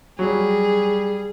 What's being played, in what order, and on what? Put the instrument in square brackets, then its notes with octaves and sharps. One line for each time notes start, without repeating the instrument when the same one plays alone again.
[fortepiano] F#3 [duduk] G3 [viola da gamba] G#4